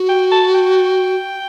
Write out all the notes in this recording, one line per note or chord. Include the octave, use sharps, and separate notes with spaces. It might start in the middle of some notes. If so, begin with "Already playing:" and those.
Already playing: F#4
G5
A5
G5